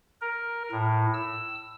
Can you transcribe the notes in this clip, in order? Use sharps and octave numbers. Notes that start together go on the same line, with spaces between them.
A#4
A2
E6